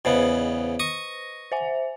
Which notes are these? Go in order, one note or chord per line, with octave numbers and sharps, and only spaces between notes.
E2 C#3 B3 B4 C5 D#5
C#6 D#6 A#6
C5 E5 G#5